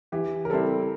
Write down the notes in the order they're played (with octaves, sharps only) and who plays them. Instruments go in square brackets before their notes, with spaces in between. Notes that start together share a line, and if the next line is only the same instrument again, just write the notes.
[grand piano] E3 [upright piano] G4
[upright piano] A#4
[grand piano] G3 C4 E4 [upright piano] A4